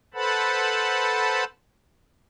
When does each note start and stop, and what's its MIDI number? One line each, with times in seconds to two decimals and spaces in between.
0.14 1.44 69
0.14 1.44 71
0.14 1.44 72
0.14 1.44 78
0.14 1.44 81
0.14 1.44 83